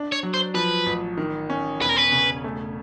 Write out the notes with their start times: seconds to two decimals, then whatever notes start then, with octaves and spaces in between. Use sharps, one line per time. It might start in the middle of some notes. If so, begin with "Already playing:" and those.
Already playing: D4
0.12 C#5
0.23 F#3
0.34 C5
0.54 F3 B4
0.86 A1
1.17 D#3
1.50 C#4
1.81 E1 B4
1.89 A#4
1.96 B4
2.12 C#3
2.44 A3